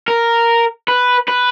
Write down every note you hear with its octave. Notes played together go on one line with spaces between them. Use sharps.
A#4
B4
B4